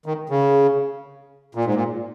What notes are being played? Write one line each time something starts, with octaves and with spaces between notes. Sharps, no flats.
D#3
C#3
A#2
G#2
A#2